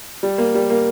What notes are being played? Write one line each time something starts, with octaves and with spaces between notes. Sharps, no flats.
G3
A#3
G3
A#3